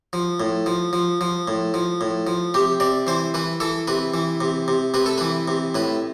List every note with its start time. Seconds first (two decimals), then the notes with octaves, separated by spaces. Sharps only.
0.13 F3
0.40 A2
0.66 F3
0.93 F3
1.21 F3
1.48 A2
1.74 F3
2.01 A2
2.27 F3
2.54 C3 G4
2.80 C3 D5
3.07 E3 C5
3.34 E3 B4
3.60 E3 A4
3.87 C3 B4
4.14 E3
4.41 C3
4.68 C3
4.94 C3 B4
5.06 A4
5.18 E3 B4
5.48 C3
5.75 A2 B4